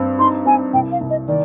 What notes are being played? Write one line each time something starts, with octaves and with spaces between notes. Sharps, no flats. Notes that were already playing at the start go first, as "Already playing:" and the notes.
Already playing: G2 C4
D#4 C6
C4 G#5
C2 G5
F5
C2
D#5
D#3 D5